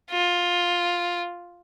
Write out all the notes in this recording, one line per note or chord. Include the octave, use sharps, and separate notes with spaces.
F4